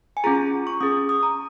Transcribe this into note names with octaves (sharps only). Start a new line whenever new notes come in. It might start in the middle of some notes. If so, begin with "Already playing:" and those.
G#5
C#4 F4 G#4 A#5
C#6
C#4 G#4 D#6
D#6
A#5